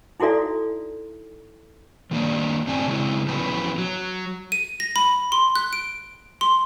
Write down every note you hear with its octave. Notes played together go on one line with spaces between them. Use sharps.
D#4 E4 F#4 A4 D5 E5
D#3 A#3 D4
F#2 A2 C4 D5 G#5 A5
C#3 G#3 E4
F3 F#3 B3 C#4 E4 B4
F#3
D#7
A#6
B5
C6
F#6
D7
C6